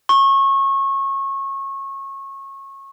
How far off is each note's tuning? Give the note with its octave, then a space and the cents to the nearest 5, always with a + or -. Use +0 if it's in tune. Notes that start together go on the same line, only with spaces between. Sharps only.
C#6 -25